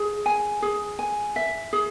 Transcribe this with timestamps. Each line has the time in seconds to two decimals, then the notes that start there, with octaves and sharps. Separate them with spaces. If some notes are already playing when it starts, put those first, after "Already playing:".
Already playing: G#4
0.26 G#5
0.62 G#4
0.99 G#5
1.36 E5
1.73 G#4